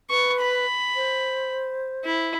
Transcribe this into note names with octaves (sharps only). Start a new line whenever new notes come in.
B4 C#6
B5
C5
E4